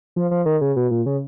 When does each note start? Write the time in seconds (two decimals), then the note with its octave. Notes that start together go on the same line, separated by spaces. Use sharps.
0.16 F3
0.31 F3
0.46 D#3
0.61 C#3
0.76 B2
0.91 A#2
1.06 C#3